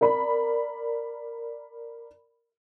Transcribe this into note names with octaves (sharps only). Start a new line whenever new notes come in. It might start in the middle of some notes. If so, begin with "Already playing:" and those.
A#4 D5 B5